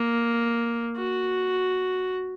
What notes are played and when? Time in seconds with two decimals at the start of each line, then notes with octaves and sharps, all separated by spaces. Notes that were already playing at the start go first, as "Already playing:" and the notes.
Already playing: A#3
0.97 F#4